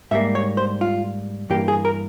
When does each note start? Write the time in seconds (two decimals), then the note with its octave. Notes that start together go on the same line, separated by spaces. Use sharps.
0.11 G#2 G3 A#3 E5
0.35 C#5
0.57 C5
0.81 F4
1.50 G2 E3 A#3 G4
1.68 G#4
1.85 A#4